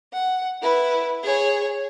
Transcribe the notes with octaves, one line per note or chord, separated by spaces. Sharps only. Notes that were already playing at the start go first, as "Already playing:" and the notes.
F#5
E4 B4
G#4 C#5